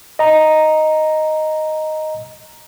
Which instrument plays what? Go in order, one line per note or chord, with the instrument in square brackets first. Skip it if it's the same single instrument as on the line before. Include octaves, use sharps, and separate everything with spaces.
[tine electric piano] D#5 A#5